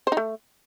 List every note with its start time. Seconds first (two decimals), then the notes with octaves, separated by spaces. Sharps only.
0.07 C5
0.12 D#4
0.17 A3